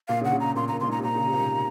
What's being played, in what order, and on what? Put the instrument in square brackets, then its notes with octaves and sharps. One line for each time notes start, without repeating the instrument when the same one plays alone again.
[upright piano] A#2 [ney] F5
[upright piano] C#3
[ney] F#5
[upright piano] C#3
[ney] A#5
[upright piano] A#2 [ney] C6
[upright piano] A#2 [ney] A#5
[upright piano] A#2 [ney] C6
[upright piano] G#2 [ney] A#5
[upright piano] C3
[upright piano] A#2 [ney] A#5
[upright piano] C#3
C3
A#2
G#2